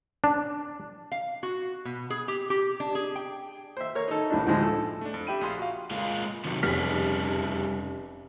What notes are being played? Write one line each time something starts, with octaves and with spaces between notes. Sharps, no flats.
D4
F5
F#4
B2
G#4
G4
G4
D4
G#4
G5
C5 E5
A#4 C#5
D#4 A4
C2 A2 D4
D2 A2 D3 F3 G#3
A4
A3 D4
F2
G4 E5 G5 B5 D#7
A#1 F4 G#4 C6
F#4 F5
G#3 A#3 F4
C3 D#3 F#3
F1 G3 C#4 G#4 F6 B6